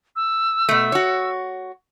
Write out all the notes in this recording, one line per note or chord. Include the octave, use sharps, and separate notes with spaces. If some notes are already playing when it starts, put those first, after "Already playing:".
E6
B2 A3
F#4 C#5